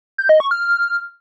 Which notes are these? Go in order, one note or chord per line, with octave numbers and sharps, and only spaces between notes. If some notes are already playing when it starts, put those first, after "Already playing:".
G6
D#5
C#6
F6